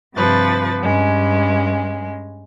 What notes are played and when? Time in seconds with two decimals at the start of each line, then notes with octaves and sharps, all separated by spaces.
0.14 G2 C3 F3 B4 A6
0.80 G2 G#3 C#4